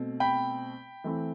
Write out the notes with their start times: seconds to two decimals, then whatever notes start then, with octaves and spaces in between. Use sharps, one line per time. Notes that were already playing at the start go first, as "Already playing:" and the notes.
Already playing: B2 A3 C4
0.20 G5 B5
1.04 E3 A3 C4